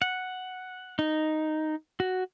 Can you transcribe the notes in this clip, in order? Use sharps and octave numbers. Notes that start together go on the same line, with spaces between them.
F#5
D#4
F#4